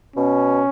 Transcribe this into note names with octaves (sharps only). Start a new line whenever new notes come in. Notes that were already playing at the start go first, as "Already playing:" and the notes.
B2 C#4